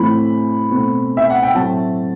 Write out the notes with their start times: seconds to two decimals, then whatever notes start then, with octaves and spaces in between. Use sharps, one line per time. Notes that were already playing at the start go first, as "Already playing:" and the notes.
Already playing: A2 E3 A3 C4 B5
0.70 B2 A3 C4
1.17 E5
1.30 F#5
1.42 G5
1.55 A2 F#3 A3 C4 A5